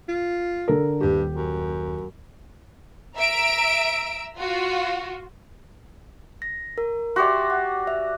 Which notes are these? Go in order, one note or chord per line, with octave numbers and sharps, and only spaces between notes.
F4
D3 A4 A#4
D#1 G2 G4
F#2
E5 A#5 E6 D7
F4 F#4
A#6
A#4
F#4 G4 D5 E5 C6
F#5
E5